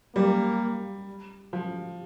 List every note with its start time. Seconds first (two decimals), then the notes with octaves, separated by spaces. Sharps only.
0.15 G3 A#3
1.53 F3